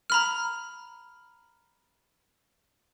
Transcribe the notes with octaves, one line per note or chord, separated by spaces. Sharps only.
A#5 B5 F6